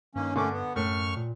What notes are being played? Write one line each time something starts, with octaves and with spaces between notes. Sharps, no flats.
G2 D#3 A#3 C#4
D3 A3 C#4 C#6 D6
B3
F#2 A2 C#6 F6
A#2